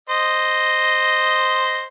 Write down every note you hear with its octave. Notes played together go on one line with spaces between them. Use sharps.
C5 D#5